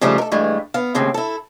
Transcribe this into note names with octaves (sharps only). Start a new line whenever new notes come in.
C#3 F3 G3 A3 D#4
A4 A#4
G2 E3 G#3 A3
B3 F5
D#2 A2 C#3 C4 G#4
E4 A4